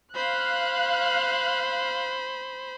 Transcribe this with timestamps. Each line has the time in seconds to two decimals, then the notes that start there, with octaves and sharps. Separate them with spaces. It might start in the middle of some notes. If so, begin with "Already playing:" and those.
0.15 C5 F5 B5 F#6